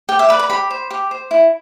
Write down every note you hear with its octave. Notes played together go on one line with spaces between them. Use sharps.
G4 G5
E5
B4 D5 B5
B5
G4 B5
C5
G4
C5
E4